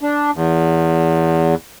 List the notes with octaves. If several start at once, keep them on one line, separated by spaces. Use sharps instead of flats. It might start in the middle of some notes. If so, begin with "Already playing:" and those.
D4
E2